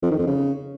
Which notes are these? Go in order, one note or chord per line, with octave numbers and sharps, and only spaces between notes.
F2
D#3
F2
C#3